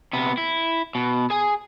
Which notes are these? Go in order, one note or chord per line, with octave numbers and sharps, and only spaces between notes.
C3 B3
E4
B2
G#4 G#5